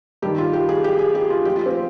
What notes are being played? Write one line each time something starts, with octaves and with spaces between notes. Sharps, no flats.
G2 D#3 G4
F4
G4
G#4
G4
G#4
G4
F4
A#2 F3 G4
F4
C4